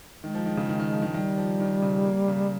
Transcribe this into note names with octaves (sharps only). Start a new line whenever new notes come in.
D#3 G#3
F3
D#3
C#3
D#3
D#3
F3
D#3
D#3 G3
F3
D#3
C#3
A#3
C#3